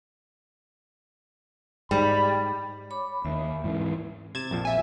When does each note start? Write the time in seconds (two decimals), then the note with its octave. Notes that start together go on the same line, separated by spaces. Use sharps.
1.91 G#2 G3 B5
2.90 C#5 B5 D6
3.25 D#2 A#3 E5
3.64 G#2 E3
4.35 C3 G#6 A6 E7
4.51 A#1 F2 F3
4.65 E5 G#5